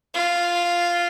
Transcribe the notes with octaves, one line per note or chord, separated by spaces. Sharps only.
F4